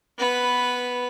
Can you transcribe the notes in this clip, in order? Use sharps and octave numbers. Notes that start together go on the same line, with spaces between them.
B3 B4